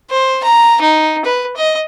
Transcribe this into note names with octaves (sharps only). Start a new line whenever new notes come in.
C5
A#5
D#4
B4
D#5